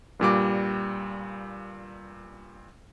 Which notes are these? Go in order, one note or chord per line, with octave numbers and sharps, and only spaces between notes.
G2 A#2 G3 D6